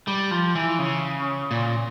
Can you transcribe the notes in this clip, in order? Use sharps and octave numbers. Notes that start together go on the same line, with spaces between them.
G3
F3
E3
C#3
A#2